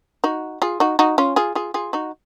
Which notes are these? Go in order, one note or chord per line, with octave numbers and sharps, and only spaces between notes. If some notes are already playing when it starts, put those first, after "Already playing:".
D#4 F#4
F4 G#4
D#4 F#4
D#4 F#4
C#4 F4
F4 G#4
F4 G#4
F4 G#4
D#4 F#4